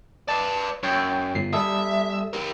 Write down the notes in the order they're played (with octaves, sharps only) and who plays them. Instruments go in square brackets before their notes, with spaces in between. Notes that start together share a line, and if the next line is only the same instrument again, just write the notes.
[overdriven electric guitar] B4 D5 [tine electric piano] A5
[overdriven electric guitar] F#2 [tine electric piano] C#5 G5
[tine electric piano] G1 C7
[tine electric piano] G3 A4 D#6 [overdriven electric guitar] E5
[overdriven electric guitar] G4 A#4